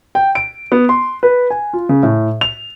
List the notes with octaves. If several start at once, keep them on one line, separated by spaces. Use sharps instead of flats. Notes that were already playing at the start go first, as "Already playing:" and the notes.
G5
D7
B3
C6
B4
G#5
F4
C#3
A2
F7